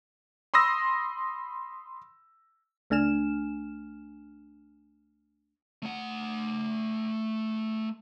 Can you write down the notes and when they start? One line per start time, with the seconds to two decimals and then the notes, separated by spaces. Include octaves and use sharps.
0.54 B5 C6 D#6 E6 A#6
2.90 C#2 A3 D4 G#5 F6 E7
5.82 A3 F#5